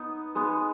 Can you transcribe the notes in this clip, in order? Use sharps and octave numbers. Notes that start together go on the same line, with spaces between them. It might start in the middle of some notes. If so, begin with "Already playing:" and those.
Already playing: B3 D#4
G#3 B3 D#4